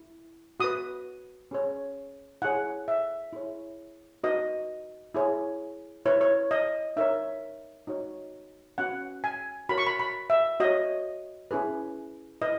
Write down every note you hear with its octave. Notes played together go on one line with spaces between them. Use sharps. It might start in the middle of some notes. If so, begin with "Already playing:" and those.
Already playing: E4
F#4 B4 D#6
C#4 G#4 C#5
E4 G#4 C#5 F#5
E5
E4 G#4 C#5
D#4 F#4 B4 D#5
E4 G#4 C#5
E4 B4 C#5
C#5
D#5
D#4 A#4 C#5 E5
D#4 F#4 C#5
C#4 F#4 B4 F#5
G#5
F#4 A#4 C#5 B5
C#6
B5
B5
E5
F#4 C#5 D#5
C#4 E4 G#4 B4
E4 B4 D#5